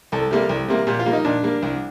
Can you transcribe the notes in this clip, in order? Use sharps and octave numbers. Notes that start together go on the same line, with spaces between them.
C2 A4
C3 G3 A#3
C2
C3 G3 A#3
A#2 G4
F4
G3 A#3
D#4
A#2 D4
G3 A#3
C2